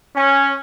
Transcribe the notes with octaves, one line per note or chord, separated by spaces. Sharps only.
C#4